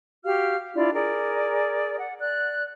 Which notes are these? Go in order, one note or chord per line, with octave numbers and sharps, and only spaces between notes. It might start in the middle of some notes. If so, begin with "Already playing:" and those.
F#4 G4 F5 F6
D4 E4 F4 D5
G#4 A#4 D5
F#5
D5 F#6